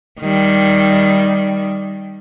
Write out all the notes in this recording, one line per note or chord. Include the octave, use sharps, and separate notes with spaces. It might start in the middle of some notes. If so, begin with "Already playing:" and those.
D#3 G3